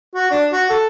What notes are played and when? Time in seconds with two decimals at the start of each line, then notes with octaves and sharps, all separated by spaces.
0.15 F#4
0.31 D4
0.53 F#4
0.70 A4